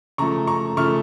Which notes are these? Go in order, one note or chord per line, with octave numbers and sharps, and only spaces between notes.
C#3 F3 A3 A#5 C#6
A#5 C#6
C#3 F3 A3 C#6 F6